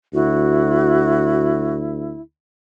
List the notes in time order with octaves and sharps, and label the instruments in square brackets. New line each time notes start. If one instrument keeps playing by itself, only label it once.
[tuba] D2 [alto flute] E4 [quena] F#4